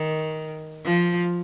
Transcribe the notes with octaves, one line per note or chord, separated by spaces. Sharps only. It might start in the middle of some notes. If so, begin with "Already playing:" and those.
Already playing: D#3
F3